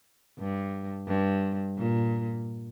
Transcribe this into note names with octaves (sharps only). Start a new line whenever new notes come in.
G2
G2
A#2